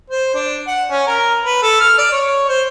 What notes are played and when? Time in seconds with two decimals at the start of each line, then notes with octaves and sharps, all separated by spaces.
0.10 C5
0.34 D4
0.67 F#5
0.91 C#4
1.07 A#4
1.44 B4
1.63 A4
1.80 F6
1.98 D5
2.12 C#5
2.48 C5